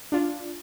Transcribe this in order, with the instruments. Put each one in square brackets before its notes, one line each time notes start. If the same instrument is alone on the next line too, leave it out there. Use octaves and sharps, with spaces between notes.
[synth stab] D4 F4